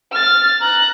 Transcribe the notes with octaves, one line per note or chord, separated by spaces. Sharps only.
F6 A6
A#5 F#6